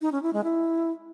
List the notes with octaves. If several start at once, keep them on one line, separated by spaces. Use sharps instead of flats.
D#4
C#4
E4
G#3
E4